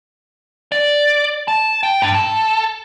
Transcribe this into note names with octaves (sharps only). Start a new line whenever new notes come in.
D5
A5
G5
G2
A4